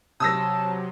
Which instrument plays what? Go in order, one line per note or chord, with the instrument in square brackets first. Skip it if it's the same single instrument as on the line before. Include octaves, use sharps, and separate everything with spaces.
[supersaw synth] C3 F#3 [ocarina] A5 [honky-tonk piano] D#6 E6 A#6